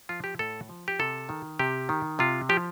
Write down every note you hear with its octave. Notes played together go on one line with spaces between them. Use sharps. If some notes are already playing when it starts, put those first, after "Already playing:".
F3 F4
G4
A2 A4
F3
G4
C3 A4
D#3
C3 G4
D#3
C3 F4
F3 G4